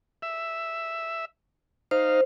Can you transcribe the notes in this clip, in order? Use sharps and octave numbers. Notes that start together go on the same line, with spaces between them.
E5
D#4 C5 F5